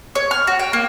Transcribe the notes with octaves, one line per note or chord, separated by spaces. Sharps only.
C#5
F6
F#4
G5
A#3